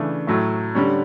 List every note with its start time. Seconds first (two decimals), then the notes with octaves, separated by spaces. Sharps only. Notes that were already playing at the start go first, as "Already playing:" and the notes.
Already playing: C#3 E3 A3 D4
0.27 A2 F#3 A3
0.75 D3 G3 C#4